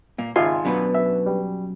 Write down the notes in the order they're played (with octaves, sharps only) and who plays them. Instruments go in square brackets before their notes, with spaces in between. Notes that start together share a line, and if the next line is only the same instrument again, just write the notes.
[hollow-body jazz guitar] A#2 [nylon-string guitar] A#3
[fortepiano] G#1 F4 G#5 [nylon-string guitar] C#3 E5 [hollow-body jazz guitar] C6
[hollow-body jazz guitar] F#2 B2 [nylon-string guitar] B3 D4 B4
[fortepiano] E5
G3